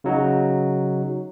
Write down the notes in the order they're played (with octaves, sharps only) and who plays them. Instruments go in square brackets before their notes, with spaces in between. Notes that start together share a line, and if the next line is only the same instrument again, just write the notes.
[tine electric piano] C#3 F#3 D#4 F#4